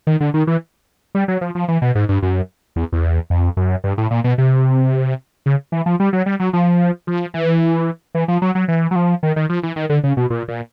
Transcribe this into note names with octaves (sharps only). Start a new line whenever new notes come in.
D#3
D3
D#3
E3
G3
F#3
F3
F3
E3
B2
G#2
G2
F#2
E2
E2
F2
F#2
G2
A2
A#2
B2
C3
C#3
E3
F3
G3
F#3
G3
F#3
F3
F3
E3
E3
F3
F#3
F#3
E3
F#3
F3
D#3
D#3
F3
E3
D#3
D3
C#3
B2
A#2
A#2